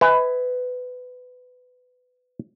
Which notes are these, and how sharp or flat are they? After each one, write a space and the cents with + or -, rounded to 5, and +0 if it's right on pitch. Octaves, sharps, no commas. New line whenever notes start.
B4 +20 E5 -45 G#5 +0